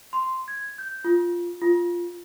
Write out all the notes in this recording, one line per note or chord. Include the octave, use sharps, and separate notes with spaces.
C6
G#6
G6
F4
F4